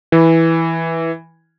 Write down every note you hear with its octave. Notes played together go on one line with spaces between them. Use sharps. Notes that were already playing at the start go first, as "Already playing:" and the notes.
E3